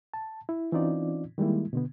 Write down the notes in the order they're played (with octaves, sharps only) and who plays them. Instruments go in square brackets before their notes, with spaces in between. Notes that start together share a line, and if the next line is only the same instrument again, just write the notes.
[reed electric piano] A5
E4
E3 C4 C#4 D#4 F4 D5
D#3 G3 G#3 A#3 E4
B2 D3 B3